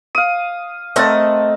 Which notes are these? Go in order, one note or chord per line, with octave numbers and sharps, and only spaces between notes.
F5 D#6
A3 C4 A#4 D#5 F#5 A5